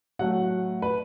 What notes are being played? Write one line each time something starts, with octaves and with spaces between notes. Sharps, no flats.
A2 F#3 A3 F#5
B4